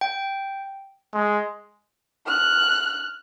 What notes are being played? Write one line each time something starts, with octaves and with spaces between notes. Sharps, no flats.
G5
G#3
F6 F#6